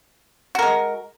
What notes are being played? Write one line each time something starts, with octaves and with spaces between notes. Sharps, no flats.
G#3 F#4 A#4